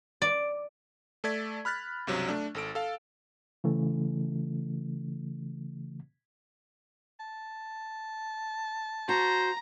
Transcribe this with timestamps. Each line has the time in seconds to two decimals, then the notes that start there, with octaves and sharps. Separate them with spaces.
0.22 D5
1.24 A3 A4 D5 G#6 B6
1.65 B5 F6 F#6 A6 B6
2.07 C#2 G2 C3 F#3
2.29 A3 D4
2.55 G#1 A4 D7
2.75 A4 F5
3.64 C#3 E3 A3
7.20 A5
9.09 F#4 C5 A#5